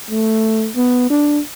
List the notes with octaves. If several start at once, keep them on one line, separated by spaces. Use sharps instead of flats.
A3
B3
D4